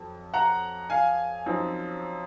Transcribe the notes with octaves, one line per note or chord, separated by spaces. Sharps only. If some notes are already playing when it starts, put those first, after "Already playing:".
Already playing: F2 F#3
F#5 A#5
F5 G#5
F#2 F3 C4 D#4